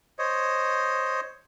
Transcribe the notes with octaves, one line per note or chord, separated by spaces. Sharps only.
C5 C#5 D#5